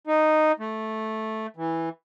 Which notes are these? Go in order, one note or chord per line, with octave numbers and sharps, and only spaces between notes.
D#4
A3
E3